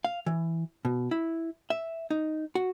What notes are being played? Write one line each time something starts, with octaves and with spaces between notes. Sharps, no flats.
F5
E3
B2
E4
E5
D#4
F#4